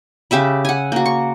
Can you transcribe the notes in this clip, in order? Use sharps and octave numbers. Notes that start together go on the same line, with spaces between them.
C#3 G4 E5 B5
F#5 G#5
A#3 F#4
C#6